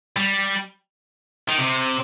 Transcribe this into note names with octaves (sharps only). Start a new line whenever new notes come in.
G3
D#3
C3